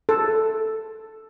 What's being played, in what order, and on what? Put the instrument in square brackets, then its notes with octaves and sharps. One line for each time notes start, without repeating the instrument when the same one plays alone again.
[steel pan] A4